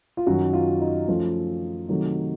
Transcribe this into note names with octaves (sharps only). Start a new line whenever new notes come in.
F4
F#2 D#3 F#3 F#4
F4
D#4
F#2 F3 A3 F4
C3 D#3 F#3 A3